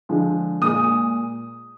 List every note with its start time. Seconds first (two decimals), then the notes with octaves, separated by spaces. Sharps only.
0.09 D3 F3 G#3
0.62 A#2 G#3 D#6